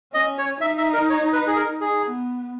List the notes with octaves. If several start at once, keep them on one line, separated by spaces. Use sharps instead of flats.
C#4 D#5
C#5
D#4 E5
E5
A#4
C#5
B4
G#4
A#4
G#4
B3